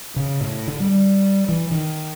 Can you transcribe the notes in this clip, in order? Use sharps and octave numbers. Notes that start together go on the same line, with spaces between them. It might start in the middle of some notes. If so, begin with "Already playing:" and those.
C#3
A2
D3
G3
E3
D#3